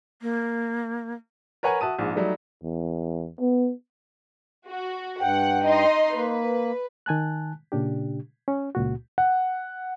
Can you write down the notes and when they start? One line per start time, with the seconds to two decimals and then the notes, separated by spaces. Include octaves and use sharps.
0.22 A#3
1.63 A#4 B4 C#5 F#5 G#5 A#5
1.81 F#4 E5 A5 D#6 D#7
1.99 A#1 G#2
2.15 F#3 G3 A3 D#4
2.63 E2
3.40 B3
4.67 F#4
5.21 G2 F#5 G5
5.64 D#4 D#5 C6
6.15 A#3 B4
7.06 D#3 G#5 A5 F#6
7.72 A#2 C#3 D4 G4
8.48 C#4
8.75 C#2 A#2 F#4
9.18 F#5